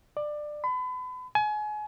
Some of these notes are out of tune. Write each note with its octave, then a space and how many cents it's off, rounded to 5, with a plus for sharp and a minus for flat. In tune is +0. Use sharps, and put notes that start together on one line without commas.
D5 +20
B5 +35
G#5 +30